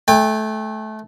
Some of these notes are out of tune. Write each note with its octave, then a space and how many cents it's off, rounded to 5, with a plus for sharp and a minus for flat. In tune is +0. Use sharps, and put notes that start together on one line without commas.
A3 -20 G5 +30